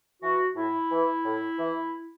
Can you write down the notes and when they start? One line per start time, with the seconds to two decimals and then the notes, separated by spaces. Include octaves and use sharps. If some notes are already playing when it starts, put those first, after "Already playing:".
0.22 E3 F#4
0.56 A2 E4
0.91 E3
1.24 A2
1.59 E3